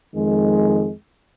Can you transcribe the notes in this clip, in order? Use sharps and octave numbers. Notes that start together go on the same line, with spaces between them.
F2 D#3 G#3